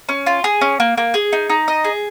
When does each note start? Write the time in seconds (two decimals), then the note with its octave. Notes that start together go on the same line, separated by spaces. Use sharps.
0.09 C#4
0.26 F4
0.44 G#4
0.61 C#4
0.80 A#3
0.98 A#3
1.14 G#4
1.33 D#4
1.50 D#4
1.68 D#5
1.84 G#4